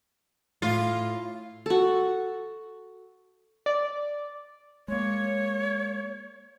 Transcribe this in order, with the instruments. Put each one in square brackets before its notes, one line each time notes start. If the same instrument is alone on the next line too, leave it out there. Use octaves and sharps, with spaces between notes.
[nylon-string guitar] A2 [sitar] F4
[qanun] F#4 A4
[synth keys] D5
[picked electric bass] G#3 A#3 [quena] C#5